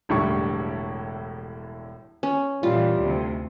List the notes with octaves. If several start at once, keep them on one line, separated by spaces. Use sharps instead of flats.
E1 A2 D3 G3 E4 C#6
C#4
A#2 E3 G3 F4
D2 C3